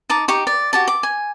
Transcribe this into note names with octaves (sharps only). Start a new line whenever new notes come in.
D#4 A5 D6
D#4 G4 C#6
D5
F#4 G4 A5
D6
G#5